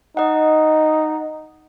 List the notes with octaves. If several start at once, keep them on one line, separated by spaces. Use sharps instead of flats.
D#4 D#5 F#5